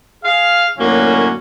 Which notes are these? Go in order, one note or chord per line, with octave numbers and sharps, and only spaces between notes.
G#4 F5
F#2 A2 D3 A#3 C#4 F#4